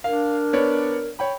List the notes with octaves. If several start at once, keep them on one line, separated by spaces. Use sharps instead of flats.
D4 A#4 F5
B3 C#5 D5
C#5 G5 B5